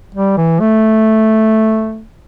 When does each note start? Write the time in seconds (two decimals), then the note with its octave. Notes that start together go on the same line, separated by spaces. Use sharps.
0.15 G3
0.38 E3
0.60 A3